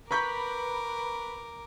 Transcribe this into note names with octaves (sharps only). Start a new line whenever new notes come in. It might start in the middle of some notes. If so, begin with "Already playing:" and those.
A#4 B4 A#5 B5 C#6 D6 G6